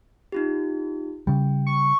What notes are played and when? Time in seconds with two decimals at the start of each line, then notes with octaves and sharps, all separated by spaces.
0.32 D#4 F4 G4
1.27 C#3 G3 G5
1.67 C#6